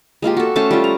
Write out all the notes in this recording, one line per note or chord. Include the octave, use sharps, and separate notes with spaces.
G#3 A#3 F4 G4
F#4 A4
A3 C#4 C5 A5
G3 F4
A#5